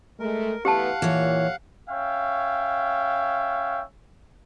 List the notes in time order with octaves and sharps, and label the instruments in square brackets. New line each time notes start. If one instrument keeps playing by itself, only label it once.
[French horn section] G#3 A3 [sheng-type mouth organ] A#4
[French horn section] E3 A3 B3 [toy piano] G4 A5 [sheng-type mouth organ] F5 F#5
[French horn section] A#2 [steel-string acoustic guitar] E3 C#5
[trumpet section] C#4 C#5 E5 F5 G5